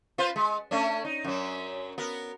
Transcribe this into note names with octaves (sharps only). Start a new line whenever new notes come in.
F4 B4 C5
G#3
A3 C#4 D4
D#4
F#2 F#3
B3 A#4